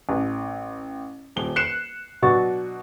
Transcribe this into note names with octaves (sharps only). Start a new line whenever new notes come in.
A1
D#1 G7
F#6 C7 C#7 E7
B2 F#3 D4 F#4 C#6 A6